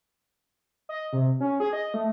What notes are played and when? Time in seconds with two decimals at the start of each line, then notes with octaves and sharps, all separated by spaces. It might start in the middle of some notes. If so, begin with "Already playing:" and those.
0.89 D#5
1.13 C3
1.40 C#4
1.60 G#4
1.73 D#5
1.94 A3